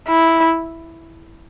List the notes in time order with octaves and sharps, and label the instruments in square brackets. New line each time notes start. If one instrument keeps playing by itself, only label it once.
[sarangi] E4